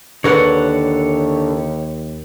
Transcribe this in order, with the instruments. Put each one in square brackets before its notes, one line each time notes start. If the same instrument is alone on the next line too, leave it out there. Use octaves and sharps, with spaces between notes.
[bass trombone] D#2 [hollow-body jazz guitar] D3 A#4 B4 [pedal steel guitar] C#5 F#5